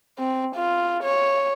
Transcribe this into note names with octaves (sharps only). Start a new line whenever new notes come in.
C4
F4
C#5